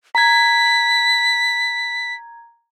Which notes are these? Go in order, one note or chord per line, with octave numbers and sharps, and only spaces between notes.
A#5 G#6 B6